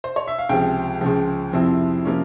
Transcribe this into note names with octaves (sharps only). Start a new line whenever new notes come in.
C5
C#5
E5
F5
C#2 C3 F3 G5
C#2 C#3 F3
F2 C3 F3 C4 E4
C3 F3 A#3 C#4